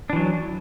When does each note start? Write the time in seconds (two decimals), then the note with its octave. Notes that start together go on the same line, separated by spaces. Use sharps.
0.10 D4
0.13 E3
0.16 F#3